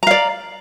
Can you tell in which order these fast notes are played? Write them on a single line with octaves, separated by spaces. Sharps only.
A#5 F5 D5